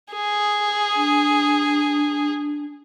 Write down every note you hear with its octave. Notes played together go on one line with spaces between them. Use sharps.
G#4
D4